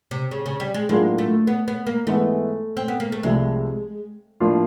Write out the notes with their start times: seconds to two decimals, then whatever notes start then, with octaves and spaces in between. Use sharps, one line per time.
0.11 C3
0.31 C#3
0.46 C#3
0.60 G3
0.74 G#3
0.89 A2 F#3 G#3 A#3 D4 F4
1.18 A3
1.47 B3
1.68 B3
1.87 A#3
2.07 G#2 E3 G#3 A3 B3 E4
2.77 C4
2.88 B3
3.00 A#3
3.12 A3
3.23 C2 C3 F3 G#3 A3
4.40 A2 F3 A#3 D4 F4